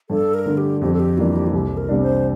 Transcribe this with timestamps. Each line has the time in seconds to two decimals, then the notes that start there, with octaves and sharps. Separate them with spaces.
0.10 G2 A4
0.34 A#4
0.46 D3 A3
0.57 G4
0.81 F2 G4
0.93 A4
1.00 G4
1.17 E3 G3 A#3 D4 F4
1.36 G4
1.46 F4
1.53 C2 G4
1.77 A#4
1.89 C3 G3 D4
2.01 C5